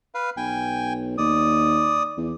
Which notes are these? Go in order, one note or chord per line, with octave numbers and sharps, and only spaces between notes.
B4 F5
B1 G5 G#5
D#2 D5 D#6
E2